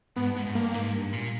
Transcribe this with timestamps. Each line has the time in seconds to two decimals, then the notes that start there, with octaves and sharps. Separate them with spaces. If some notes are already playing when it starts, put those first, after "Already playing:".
0.16 G#2 B3
0.27 G2
0.36 G#2
0.46 G#2
0.55 G2 A#3
0.74 G#2
0.93 G2
1.13 A#2